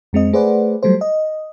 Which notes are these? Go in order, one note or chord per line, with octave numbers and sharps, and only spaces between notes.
F2 G#3 C4 D#5
A3 G#4 B4 C5 D5 F#5
F#3 G3 A3 A4 C5
D#5